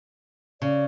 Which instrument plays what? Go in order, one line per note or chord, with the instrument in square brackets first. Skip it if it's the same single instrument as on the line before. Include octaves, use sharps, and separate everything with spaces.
[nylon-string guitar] C#3 [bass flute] D5